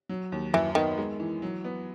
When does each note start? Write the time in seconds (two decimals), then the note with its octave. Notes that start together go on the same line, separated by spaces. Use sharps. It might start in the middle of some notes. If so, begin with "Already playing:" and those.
0.09 F#3
0.32 D#2
0.54 F#2 E3
0.75 D#3 B3
0.98 G#3
1.20 E3
1.42 F#3
1.64 B3